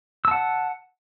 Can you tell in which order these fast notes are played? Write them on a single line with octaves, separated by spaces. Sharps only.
E6 A5 F#5